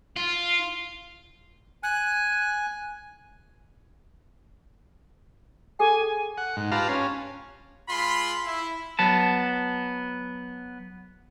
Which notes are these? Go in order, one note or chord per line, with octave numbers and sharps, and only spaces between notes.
F4
G#5 F#6
G#4 A4 G5 G#5
F#5
G#2
F4 G4 B4 F5 A5 A#5
C#4
G#3 F4 B5 C6
E4
F#3 B3 A5